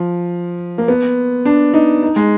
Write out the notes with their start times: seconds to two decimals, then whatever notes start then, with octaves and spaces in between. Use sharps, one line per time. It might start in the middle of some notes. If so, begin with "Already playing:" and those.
Already playing: F3
0.78 A#3
0.88 B3
1.45 D4
1.74 D#4
2.03 D#4
2.16 G#3